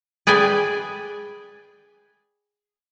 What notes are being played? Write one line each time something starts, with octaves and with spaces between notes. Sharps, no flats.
G#4 B4 D5 G5 G#5